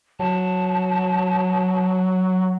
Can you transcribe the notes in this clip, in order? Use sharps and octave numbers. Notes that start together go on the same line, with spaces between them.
F#3 A5